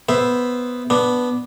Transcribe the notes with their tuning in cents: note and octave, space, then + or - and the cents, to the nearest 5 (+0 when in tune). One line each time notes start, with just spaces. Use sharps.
B3 +0 C5 +0 E5 +0
B3 +0 D4 +0